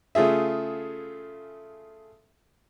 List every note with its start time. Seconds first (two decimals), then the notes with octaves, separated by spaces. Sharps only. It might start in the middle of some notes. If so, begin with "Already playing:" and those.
0.15 C#3 A3 F4 G#4 E5